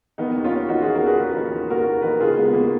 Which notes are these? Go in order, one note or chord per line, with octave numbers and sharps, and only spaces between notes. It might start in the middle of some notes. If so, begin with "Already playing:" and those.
D#3 B3 D#4
D#2
C#4 F4
D#2
D#3 D#4 F#4
F4 G#4
D#3
F#4 A#4
D#2 G#4 B4
D#2 G#4 B4
D#3
D#3
D#2 F#4 A#4
D#2
D#3 B4
A#4
C#3 F4 G#4
D#2 G#3 B3
B3
D#2 A#3